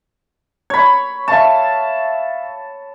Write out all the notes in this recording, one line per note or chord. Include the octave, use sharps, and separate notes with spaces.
C#5 B5 G#6
E5 F5 A5 C#6